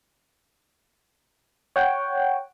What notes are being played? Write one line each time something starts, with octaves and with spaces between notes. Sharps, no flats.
C#5 F#5 G5